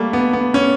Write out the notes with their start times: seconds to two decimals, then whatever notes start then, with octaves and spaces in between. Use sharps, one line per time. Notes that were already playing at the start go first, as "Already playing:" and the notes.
Already playing: G3 A3 A#3
0.13 B3
0.33 B3
0.54 C#4